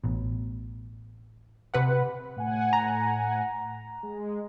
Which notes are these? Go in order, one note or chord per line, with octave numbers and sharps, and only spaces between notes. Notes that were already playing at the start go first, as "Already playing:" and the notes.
A1 B2
C3 B4 F#5
A2 F#5 G#5
A#5
G#3